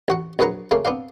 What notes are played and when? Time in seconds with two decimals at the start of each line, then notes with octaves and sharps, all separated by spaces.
0.08 A1 F#4 F#5
0.39 A#1 F#2 G#4 B4 F#5 A#5
0.71 C#3 A3 A#3
0.85 B3 C4 D4 F5